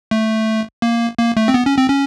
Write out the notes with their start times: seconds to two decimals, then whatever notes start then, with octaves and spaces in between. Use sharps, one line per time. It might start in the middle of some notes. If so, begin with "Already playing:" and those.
0.11 A3
0.82 A#3
1.19 A#3
1.37 A3
1.48 C4
1.54 B3
1.66 C#4
1.78 C4
1.90 C#4